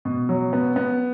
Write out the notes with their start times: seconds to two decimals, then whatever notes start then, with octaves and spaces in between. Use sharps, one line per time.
0.05 B2
0.29 F#3
0.53 B3
0.76 B3